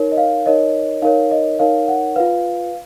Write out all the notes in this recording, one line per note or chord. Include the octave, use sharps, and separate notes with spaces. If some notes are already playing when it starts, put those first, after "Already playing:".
Already playing: D#4 A#4 C#5
D#5
F5
D#4 A#4 C#5 D#5
D#4 A#4 C#5 F5
D#5
D#4 A#4 C#5 F5
F#5
F4 B4 F5